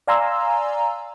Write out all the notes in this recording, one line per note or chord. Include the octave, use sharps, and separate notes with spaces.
D5 F5 G#5 A#5 C6 E6